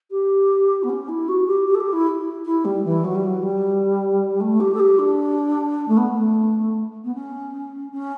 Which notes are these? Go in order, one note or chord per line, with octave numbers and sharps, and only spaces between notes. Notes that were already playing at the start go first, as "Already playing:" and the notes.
G4
B3
C#4
E4
F#4
G4
G4
A4
G4
E4
E4
G3
E3
F#3
G3
F#3
G3
A3
G4
A4
G4
D4
A3
B3
A3
B3
C#4
C#4